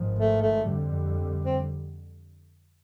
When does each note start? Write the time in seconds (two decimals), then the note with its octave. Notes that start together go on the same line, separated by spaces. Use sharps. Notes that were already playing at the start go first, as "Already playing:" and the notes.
Already playing: G#1 G#2 F3
0.19 A3
0.42 A3
0.65 F2 D3 G3
1.45 C4